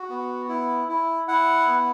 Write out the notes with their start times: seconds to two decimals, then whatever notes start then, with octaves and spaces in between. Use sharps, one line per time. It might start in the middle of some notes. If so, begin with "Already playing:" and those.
Already playing: F#4
0.09 B3
0.49 E4
0.88 E4
1.27 E4 F#5
1.67 B3